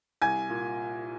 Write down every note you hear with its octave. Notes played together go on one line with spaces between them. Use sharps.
C2 G#5 G#6
A#2